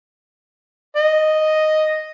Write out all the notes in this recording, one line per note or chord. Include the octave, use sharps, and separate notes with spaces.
D#5